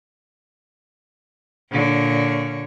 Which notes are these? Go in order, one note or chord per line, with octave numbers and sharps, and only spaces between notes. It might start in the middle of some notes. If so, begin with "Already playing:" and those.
A#2 D3 C#5